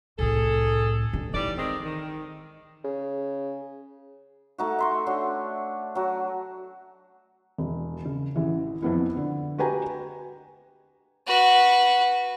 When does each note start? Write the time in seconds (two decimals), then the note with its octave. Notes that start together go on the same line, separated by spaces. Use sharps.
0.19 C2 A2 G#4 A4
1.13 G2
1.34 A2 E3 G3 D#4 D5
1.57 D#3 G#3 C4
1.84 D#3
2.84 C#3
4.58 A3 D#4 F#4
4.79 E5 C6 C#6
5.07 D4 F#4 C#5
5.95 F#3 F#4
7.58 E1
8.05 C#3
8.35 A1 E3
8.82 F2 B3 E4
9.17 D3
9.58 F#4 G4 B4 G5 G#5 A#5
11.27 F#4 B4